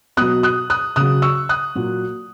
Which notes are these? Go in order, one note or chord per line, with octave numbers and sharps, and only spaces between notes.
B2 F#3 D#6 F#6
D#6 F#6
D#6 F#6
C#3 F#3 D#6 F#6
C#6 E6
D#6 F#6
A#2 F#3